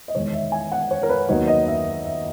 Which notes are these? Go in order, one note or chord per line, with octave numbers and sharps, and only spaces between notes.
D#5
E2 D#3 G#3 C#5
E5
G#5
F#5
C#5
A#4
B4
D#2 D#3 F#3 B3 D#4 C#5
D#5
E5
E5